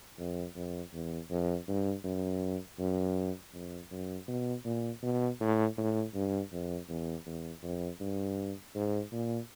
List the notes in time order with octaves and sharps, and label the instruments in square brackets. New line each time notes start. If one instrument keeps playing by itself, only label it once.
[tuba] F2
F2
E2
F2
G2
F#2
F#2
F2
F#2
B2
A#2
B2
A2
A2
G2
F2
E2
E2
F2
G2
G#2
A#2